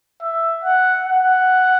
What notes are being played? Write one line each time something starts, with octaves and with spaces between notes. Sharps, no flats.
E5
F#5
F#5